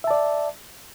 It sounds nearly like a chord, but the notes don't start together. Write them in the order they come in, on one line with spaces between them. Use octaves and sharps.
E5 A5 D5